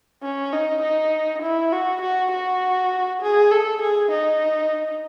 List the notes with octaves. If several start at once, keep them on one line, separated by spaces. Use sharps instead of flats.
C#4
D#4
D#4
E4
F#4
F#4
F#4
G#4
A4
G#4
D#4